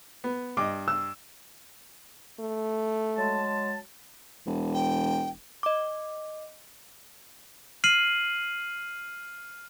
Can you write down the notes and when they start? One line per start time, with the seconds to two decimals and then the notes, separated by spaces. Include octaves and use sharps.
0.24 B3
0.57 G2 D#5 D6
0.88 E6
2.40 A3
3.16 F#3 G#3 A5
4.47 E1
4.74 G5
5.63 D#5 D6
7.84 F6 C7 D#7 F#7